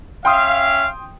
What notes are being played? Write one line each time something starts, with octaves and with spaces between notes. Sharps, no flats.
C#4 E5 F5 G5 C6 D#6